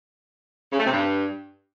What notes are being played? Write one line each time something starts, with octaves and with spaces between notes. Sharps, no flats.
C#3
A3
C3
G2